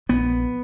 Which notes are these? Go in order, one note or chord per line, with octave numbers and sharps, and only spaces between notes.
A#1 B3